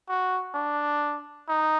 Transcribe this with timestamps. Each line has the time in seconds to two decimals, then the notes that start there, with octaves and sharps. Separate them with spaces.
0.09 F#4
0.54 D4
1.49 D#4